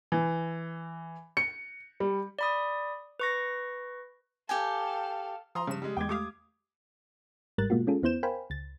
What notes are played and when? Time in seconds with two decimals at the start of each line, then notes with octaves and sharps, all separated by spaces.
0.12 E3
1.37 C#7
2.00 G3
2.39 D5 B5 D#6
3.20 B4 C#6 A#6
4.49 G4 A4 F5 G5 G#5
5.55 F3 A#5 C6 D#6
5.67 G2 C#3 E7
5.82 G3 G#3
5.97 E2 G#3 G5 D6 G#6
6.09 A3 G4 F5 D6 D#6
7.58 G#1 G#2 G3 A#4 F#6 A6
7.70 B2 G#3 A#3 F4 F#4
7.87 G#3 C#4 F4 G#4 A4
8.03 E2 B3 E4 C5 G6 E7
8.23 A#4 C5 F5 G5 G#5 B5
8.50 C#2 A6